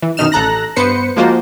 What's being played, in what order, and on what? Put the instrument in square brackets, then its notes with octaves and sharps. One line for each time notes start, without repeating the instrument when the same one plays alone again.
[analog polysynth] E3
F#2 B2 D#3 D#4 F6 E7
A1 A4 A#5 F#6 A#6
G2 B3 B4 C5 C#7
F3 G#3 A#3 F4 F#4 C5